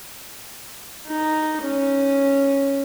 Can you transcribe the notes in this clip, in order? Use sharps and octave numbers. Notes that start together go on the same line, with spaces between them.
D#4
C#4